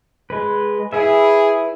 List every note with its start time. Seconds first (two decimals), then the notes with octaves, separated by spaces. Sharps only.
0.30 G#3 B4
0.93 E4 G#4 B4 E5